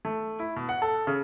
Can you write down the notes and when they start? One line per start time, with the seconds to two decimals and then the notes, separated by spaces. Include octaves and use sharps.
0.05 A3
0.39 E4
0.56 B2
0.69 F#5
0.82 A4
1.07 C#3